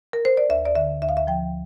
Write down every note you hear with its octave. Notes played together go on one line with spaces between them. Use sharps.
A#4
C5
D5
D2 E5
D5
D3 E5
D2 E5
F5
E5
F3 G5